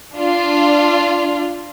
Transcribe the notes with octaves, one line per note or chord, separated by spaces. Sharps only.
D4 F4